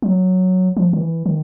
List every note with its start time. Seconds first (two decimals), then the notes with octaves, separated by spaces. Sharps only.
0.02 F#3
0.77 F3
0.93 D#3
1.01 E3
1.26 D#3